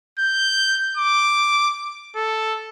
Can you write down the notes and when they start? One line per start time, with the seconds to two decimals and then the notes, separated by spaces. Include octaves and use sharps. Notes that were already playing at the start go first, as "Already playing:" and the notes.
0.19 G6
0.97 D6
2.16 A4